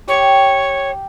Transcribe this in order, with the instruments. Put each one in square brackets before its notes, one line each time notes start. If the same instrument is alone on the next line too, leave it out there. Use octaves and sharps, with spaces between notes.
[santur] G4 G5 [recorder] C#5